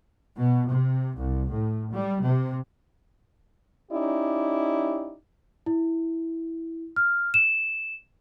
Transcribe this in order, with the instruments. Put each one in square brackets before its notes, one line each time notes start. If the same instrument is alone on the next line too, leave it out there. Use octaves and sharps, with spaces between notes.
[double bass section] B2
C3
C2
A2
G3
C3
[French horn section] C#4 D#4 E4 G4 D5
[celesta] E4
F6
E7